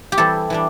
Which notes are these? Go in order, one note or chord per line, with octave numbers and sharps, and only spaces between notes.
G4
E3 G3 C4 E4 A4
E3 G3 D4